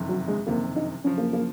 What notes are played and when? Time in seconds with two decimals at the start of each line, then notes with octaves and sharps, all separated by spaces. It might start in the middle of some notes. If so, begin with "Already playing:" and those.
Already playing: F#1 F2 C3 D#3
0.09 F#3
0.28 G#3
0.47 F#1 F2 C3 D#3 A#3
0.76 D#4
1.04 F#2 C#3 F3 C#4
1.18 A#3
1.33 A#3